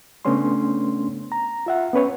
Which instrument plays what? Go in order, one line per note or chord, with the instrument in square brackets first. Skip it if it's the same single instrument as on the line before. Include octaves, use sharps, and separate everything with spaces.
[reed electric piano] C#3 A3 B3 C#4 D4 C6
A#5
F4 E5 F#5
B3 C#4 B4 C#5